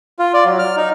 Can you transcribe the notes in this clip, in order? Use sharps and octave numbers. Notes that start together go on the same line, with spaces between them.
F4
D5
F#3
F6
D#4